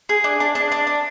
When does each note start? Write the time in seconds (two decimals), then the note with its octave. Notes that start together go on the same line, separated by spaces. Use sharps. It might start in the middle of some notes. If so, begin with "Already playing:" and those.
0.09 G#4
0.24 D4
0.40 D4
0.55 D4
0.72 D4
0.87 D4